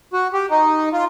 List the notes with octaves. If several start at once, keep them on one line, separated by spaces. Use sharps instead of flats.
F#4
G4
D#4
F4